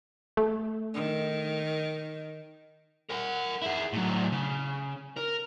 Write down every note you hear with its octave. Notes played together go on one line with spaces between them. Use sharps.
A3
D#3
A#4 F#5
E4 G#4
A2 F#3
C#3
A#4